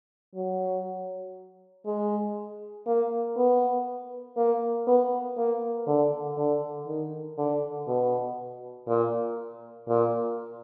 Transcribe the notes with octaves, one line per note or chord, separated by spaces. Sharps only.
F#3
G#3
A#3
B3
A#3
B3
A#3
D3
D3
D#3
D3
B2
A#2
A#2